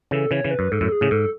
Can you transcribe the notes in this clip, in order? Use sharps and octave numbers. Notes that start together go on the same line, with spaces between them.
C#3 E3 A4
C#3 E3 C#5
C#3 E3
B4
F#2
G#2 A4
F#2 A2
G#4
A2 C#3
G#2 A4